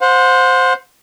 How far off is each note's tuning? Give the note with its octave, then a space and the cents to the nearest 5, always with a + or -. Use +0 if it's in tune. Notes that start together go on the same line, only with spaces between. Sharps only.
C5 +0 F#5 -40